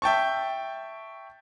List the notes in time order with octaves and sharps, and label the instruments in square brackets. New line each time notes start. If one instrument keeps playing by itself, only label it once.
[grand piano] E5 G5 A5 C#6